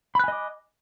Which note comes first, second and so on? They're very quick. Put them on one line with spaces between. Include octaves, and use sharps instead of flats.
B5 F#6 G#5 D#5 D6